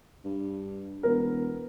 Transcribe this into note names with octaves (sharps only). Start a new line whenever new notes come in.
G2
E1 B3 A#4